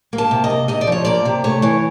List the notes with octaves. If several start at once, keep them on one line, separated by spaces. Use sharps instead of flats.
A#3
A5
C3
D#5
A#3
C3 D#5
D5
F3 C#5
A#3 D5
C3
A3 C#5
E3 C#5